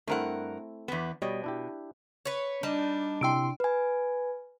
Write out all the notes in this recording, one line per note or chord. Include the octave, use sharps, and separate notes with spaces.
G2 A3 C4 E4 A#4 F#5
E2 B3
B2 G3 C#5 D#5
D4 E4 G4
B4 C#5
G3 D4 D#4 A5
C3 E4 G5 C6 E6 D7
B4 G#5